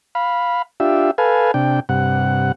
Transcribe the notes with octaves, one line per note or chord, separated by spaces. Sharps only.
F5 B5
D4 F4 G4 E5
A4 B4 F5 G#5
C3 D4 G5
G2 C3 F#5